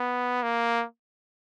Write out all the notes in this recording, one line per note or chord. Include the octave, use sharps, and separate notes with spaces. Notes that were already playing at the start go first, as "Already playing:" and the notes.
Already playing: B3
A#3